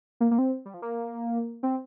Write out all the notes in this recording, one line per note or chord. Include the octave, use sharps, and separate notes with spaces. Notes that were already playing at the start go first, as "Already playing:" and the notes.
A#3
A#3
C4
G3
F3
A#3
C4